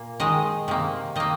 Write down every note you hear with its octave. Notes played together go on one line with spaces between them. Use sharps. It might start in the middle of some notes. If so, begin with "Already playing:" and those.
Already playing: A#2 A#3
D#3 G#3 D#5
C3 D#3 A#3
D#3 A#3 D#5